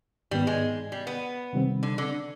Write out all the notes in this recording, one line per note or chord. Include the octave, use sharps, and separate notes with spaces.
G#2 D#3 G3 B3
G#3
G3
B3
C3 D#3 G3 C4
D3
D3